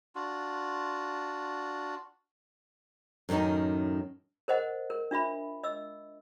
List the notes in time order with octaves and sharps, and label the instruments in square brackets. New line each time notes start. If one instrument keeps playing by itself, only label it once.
[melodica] D4 F4 F#4
[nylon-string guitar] F#2 A2 D#3 C#4 D#4
[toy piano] A#4 C5 D#5 F#5
A#4
D4 F4 E5 B5
D#5 E6